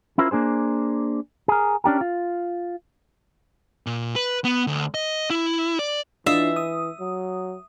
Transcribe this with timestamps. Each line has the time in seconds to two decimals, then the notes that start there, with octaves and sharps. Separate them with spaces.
0.18 C#4 E4 F4 A#4 C5
0.31 A#3 D4 G#4 C5
1.48 G#4 A#4
1.84 C#4 D4 G4 A#4
2.01 F4
3.86 A#2
4.16 B4
4.44 B3
4.67 D2
4.94 D#5
5.30 E4
5.79 D5
6.26 E3 D4 F4 D#5 E5
6.56 D#6
7.00 F#3